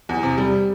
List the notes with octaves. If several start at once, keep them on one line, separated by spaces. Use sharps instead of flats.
E2
C3
G3